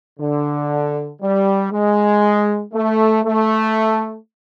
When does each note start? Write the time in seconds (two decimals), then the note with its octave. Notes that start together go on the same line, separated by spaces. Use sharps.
0.20 D3
1.22 G3
1.72 G#3
2.74 A3
3.25 A3